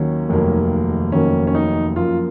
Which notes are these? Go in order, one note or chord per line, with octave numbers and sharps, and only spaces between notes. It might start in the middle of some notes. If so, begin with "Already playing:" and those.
Already playing: D#2 D#3 F#3 A#3 C#4
F1 D#2 D#3 F#3 A#3
F1 D#2 D#3 F#3 A#3 C#4
C#4
D#4
F#2 F3 A#3 F4